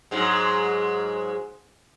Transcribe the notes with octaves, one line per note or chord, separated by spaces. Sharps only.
G#2 F#3 G#3